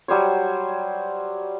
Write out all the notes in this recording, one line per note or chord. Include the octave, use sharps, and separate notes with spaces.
F#3 G3 C5 C#5